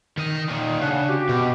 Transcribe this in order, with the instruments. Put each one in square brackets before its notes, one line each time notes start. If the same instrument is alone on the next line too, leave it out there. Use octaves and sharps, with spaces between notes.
[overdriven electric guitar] D#3 D#5
A#2 D#3
[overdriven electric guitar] C#3 [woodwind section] D4 F#5
[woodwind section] F#4 G4
[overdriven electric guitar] B2